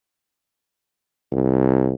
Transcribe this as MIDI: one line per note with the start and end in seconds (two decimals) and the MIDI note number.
1.32 1.94 36